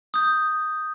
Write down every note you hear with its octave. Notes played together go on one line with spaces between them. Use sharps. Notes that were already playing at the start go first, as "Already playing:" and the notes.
D#6 G6